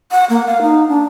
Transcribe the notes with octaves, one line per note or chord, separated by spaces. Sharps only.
F#5
A#3
F5
D#4
D4